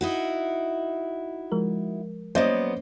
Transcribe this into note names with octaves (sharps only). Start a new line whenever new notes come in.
D#4 E4 F#4
F3 G#3 A#4
F#3 A#3 B3 C#4 C5 D5 D#5